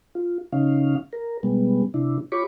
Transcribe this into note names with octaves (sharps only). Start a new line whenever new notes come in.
F4
C#3 C#4 D#4 F5
A#4
B2 G3 G#3 B3
C3 D4 E4
F4 G4 C#5 B5 C#6 D6